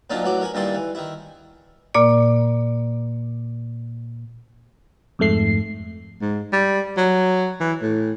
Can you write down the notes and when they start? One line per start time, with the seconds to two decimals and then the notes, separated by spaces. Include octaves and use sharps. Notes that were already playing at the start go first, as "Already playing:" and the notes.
0.10 A#2 F3 F#3 D4 D#4 F4
0.22 A1 E3 F#3 F#4 D6
0.41 A#4 G#5 B5
0.54 G2 A#2 D#3 E4 D5 C6
0.75 E3
0.95 D#3 E4
1.95 A#2 A#3 D5
5.19 F2 G#2 A3 C7
6.21 G#2
6.53 G3
6.97 F#3
7.60 E3
7.82 A2